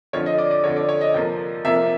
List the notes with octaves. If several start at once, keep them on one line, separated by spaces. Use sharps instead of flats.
F2 D3 F3 C#5
D#5
D5
D5
F2 D3 F3 C#5
D5
C#5
D#5
F2 C3 F3 A#3
F2 C3 F3 A#3 E5